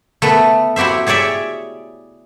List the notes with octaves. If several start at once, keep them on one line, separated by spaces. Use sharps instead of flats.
A3 B3 A4 B4
E4 F#4 G4 C5 E5
G4 G#4 C#5 D5 E5